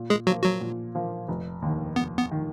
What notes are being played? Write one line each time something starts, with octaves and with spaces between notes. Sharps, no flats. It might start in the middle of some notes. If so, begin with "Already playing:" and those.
Already playing: A#2
G#3 G#4
F3 F#3 A#3 F#4
F#3 F#4
A#2
F3 A#3
F1
D#2 D#3
F1 B3
B3
D#3